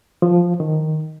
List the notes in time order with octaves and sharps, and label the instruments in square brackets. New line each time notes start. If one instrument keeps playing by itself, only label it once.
[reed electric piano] F3
D#3